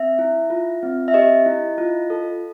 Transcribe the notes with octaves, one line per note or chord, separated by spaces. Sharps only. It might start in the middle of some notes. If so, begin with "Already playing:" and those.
Already playing: C4 E5
E4
F4
C4
E5
G4 D#5
E4
F4
A4